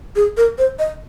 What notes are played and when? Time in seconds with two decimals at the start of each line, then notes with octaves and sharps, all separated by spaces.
0.16 G#4
0.37 A#4
0.58 C5
0.79 D#5